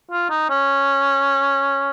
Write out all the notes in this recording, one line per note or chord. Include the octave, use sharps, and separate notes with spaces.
F4
D#4
C#4